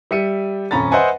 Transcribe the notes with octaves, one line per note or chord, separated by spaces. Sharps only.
G3 E5 C#7 D#7
D#1 F2 C#4 A#5 B5 A6
B4 C5 D#5 E5 F#5 G#5